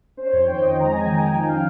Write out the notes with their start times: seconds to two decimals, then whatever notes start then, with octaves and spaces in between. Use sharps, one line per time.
0.17 C#4 C5
0.26 C#5
0.32 F2 C5
0.46 D#3 G5
0.61 F2 D#5
0.76 G#3 A#5
0.90 G#3 G#5
1.05 D#3 G5
1.19 D#3 G#5
1.34 F3 G5
1.48 C#4 F5